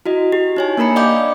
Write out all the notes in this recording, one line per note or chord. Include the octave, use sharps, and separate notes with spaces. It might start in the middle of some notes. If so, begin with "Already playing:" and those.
E4 F#4 D#5
G4
D#4 C#5 G#5
A#3 D4 A#4 A#5 B5 C#7
D5 D#5 F5 G5 D6 G6